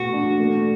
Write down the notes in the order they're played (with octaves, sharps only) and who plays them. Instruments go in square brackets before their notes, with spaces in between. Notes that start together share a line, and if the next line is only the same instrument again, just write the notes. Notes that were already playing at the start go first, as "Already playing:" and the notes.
Already playing: [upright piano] B2 A3 [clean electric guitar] F#4
[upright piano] D4
A3